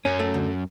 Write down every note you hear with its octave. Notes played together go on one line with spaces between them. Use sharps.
F#2 C#4
A3
D2